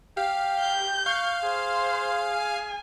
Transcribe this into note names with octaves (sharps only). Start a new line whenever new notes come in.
G4 F5
G6
F5 C#6
G#4 C5
G#5